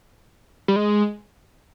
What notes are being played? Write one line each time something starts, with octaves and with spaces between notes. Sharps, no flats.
G3
G#3